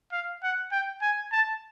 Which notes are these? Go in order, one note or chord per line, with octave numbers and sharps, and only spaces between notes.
F5
F#5
G5
G#5
A5